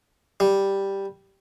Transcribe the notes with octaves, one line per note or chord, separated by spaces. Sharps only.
G3